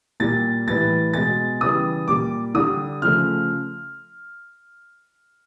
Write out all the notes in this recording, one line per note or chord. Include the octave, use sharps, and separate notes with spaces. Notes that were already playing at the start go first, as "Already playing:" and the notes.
A#2 G3 A6
A2 E3 G3 A6
B2 G#3 A6
C#3 E3 G3 D#6
A#2 G3 D6
D3 G3 D#6
C#3 F3 A3 F6